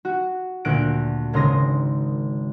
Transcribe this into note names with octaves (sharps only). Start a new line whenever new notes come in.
F#4
D2 A#2 F#6 A#6 D7
G#1 C#3 A#4 C6 D#6 A#6